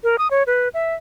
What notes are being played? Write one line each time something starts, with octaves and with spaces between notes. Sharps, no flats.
A#4
D#6
C#5
B4
E5